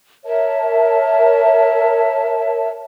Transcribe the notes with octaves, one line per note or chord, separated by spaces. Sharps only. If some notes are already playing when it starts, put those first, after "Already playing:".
A#4 C#5 E5 A5